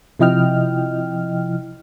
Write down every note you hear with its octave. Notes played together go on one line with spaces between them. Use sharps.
C3 F3 E4 D#5 G5 F6